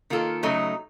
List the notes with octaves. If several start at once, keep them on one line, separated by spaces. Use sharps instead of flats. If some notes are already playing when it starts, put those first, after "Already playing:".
D#3 A#3 F4 A4
C#3 F#3 A3 D#4